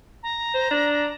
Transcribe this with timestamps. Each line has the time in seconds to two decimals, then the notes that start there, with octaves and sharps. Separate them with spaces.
0.22 A#5
0.54 C5
0.71 D4